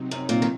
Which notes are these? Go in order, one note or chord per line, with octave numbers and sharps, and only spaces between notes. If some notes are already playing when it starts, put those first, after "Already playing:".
Already playing: C3 F#3 C4 D#4
F#2
A#2
D#3